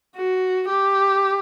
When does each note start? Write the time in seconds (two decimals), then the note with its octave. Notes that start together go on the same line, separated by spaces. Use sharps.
0.16 F#4
0.69 G4